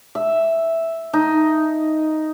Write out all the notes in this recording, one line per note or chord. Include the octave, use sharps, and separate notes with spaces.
E5
D#4